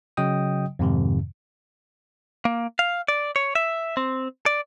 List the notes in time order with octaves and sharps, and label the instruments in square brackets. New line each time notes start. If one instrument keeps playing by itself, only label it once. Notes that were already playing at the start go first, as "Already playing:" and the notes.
[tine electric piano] C#3 F#3 D#5 G5 D#6
F2 G#2 C3 D#3
[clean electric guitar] A#3
F5
D5
C#5
E5
C4
D5